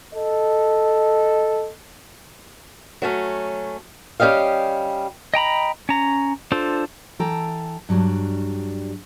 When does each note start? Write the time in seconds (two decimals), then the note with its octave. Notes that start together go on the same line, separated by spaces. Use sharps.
0.13 A4 D#5
3.02 F#3 A3 C#4
4.20 G3 C#4 G4 D#5 F5
5.34 D#5 G5 A#5 B5
5.89 C#4 A#5
6.52 D4 F4 A4 C5
7.19 E3 A4 G5 A#5
7.89 G2 F#3 G3 D4